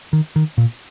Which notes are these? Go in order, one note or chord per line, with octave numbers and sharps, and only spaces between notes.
D#3
D#3
A#2